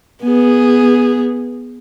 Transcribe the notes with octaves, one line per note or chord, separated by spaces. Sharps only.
B3 G#4